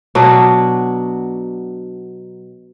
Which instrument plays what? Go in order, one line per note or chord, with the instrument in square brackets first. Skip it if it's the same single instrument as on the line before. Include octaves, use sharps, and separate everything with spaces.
[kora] B2 F#3 D4